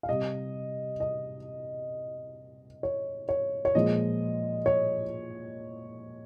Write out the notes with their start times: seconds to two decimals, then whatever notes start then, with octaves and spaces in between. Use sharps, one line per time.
0.03 F5
0.09 C3 G3 D#5
1.00 D#5
2.83 C#5
3.29 C#5
3.65 C#5
3.75 A#2 F3 G#3 D#5
4.66 C#5